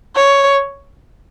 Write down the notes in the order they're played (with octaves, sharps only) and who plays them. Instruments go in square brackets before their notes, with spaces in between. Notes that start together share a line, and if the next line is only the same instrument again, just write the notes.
[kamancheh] C#5